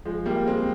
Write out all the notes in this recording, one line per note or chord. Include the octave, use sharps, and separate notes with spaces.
F3 G#3
G3 A#3
G#3 C4